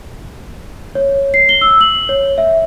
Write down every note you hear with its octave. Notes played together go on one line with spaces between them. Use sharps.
C#5
C7
G7
E6
F#7
C#5
E5